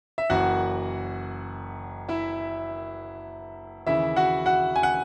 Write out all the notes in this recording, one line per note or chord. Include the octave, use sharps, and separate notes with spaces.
E5
F#1 F#2 E3 F#4 F#5
E4 E5
D#2 C#3 E3 E4 E5
F#4 F#5
F#4 F#5
G#5
F#5